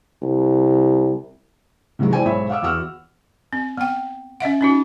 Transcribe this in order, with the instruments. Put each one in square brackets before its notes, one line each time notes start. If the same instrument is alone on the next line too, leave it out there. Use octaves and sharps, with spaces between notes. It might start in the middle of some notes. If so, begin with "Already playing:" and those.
[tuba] C2
[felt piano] C3 D#3 E3 F#3 G#3
E4 C5 D5 G5 G#5
B1 G#2 C5 C#5 E5 B5
F5 F#5 D6 E6
E2 F#4 F#5 E6 F6
[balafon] C4
B3 G5
C#4 D#5 E5 F#5
C#4 D#4 F#4